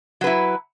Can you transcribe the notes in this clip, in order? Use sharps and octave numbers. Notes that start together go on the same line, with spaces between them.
F#3 E4 B4